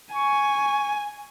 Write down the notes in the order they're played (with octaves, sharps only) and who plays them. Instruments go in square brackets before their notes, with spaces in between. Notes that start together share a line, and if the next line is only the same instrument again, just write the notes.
[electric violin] G#5 [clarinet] C#6